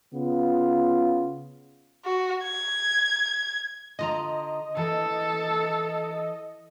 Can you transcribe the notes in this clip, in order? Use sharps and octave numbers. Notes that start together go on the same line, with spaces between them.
C#3 B3 F4
F#4
G#6
D3 F4 D#5 A#5
E3 A4